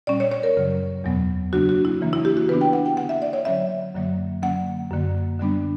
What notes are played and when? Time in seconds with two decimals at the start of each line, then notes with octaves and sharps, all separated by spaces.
0.07 A#2 G3 C#4 D5
0.20 C#5
0.32 C#5
0.43 A#4
0.56 F#2 C#3 F#3
1.04 E2 B2 F#3 B3
1.53 C#3 F#3 A#3 D4 F#4
1.69 F#4
1.85 E4
2.01 C#3 E3 A#3 D4
2.13 E4
2.25 G4
2.37 F#4
2.49 C#3 E3 B3 D4 B4
2.61 G5
2.73 F#5
2.86 G5
2.97 D3 A#3 D4 F#5
3.09 E5
3.22 D5
3.33 C#5
3.45 D3 F#3 C#4 E5
3.95 F#2 D3 F#3 A#3
4.42 D3 F#3 A#3 C#4 F#5
4.90 F#2 D3 A#3
5.39 D3 G3 B3 D4